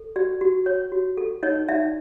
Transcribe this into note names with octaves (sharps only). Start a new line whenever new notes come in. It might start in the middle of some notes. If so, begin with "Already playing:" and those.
Already playing: A4
F#4 D5
F#4
C#5
F#4
A4
D#4 C#5 D#5
D#4 D5 E5